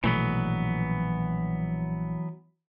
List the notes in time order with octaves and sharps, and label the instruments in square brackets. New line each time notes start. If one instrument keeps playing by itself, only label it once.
[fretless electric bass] A#1 B2 A3 [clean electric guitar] E3 F#3 B3